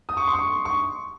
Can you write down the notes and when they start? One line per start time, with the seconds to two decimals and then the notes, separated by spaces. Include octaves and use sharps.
0.09 D#6
0.17 C#6
0.27 C6
0.34 C#6
0.65 C#6